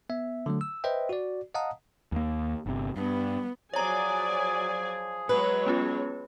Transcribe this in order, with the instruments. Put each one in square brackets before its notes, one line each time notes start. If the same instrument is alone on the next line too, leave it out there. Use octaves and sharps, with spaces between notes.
[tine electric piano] B3 E5
D3 F#3 A3
E6
B4 C5 D#5 E5 G5
F#4 D5
D#5 F5 F#5 A5 A#5 D#6
[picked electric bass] D#2 A#3
G1 C3
[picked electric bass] G2 [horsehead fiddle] B3
[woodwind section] F3 G#4 [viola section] F#3 D5 G#5 [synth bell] C#5 A#5
[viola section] F#3 G#3 C#5 [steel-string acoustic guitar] B4
[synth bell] B3 C#4 F4